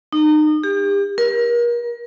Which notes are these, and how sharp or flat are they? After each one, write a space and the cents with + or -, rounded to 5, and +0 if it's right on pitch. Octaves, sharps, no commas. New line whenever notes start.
D#4 -30
G4 +35
A#4 +35